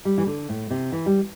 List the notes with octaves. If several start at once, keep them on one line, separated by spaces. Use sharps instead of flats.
G3
E3
D3
A2
C3
E3
G3